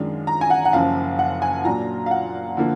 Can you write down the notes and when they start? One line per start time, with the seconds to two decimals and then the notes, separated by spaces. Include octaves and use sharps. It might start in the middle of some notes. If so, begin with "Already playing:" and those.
Already playing: F#2 D#3 G#3 D4 F4
0.27 A#5
0.41 G#5
0.50 F#5
0.65 F#5
0.73 F#1 F#2 F3 F5
1.19 F#5
1.42 G#5
1.65 A#2 F#3 D4 F4 A#5
2.06 F5
2.11 F#5
2.57 D3 F3 A#3 F4